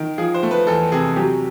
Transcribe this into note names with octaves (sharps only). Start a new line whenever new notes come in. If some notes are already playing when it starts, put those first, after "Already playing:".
Already playing: D#3
F3 G#4
C5
A3
B4
E2 A4
C3 G#4
F#3 G4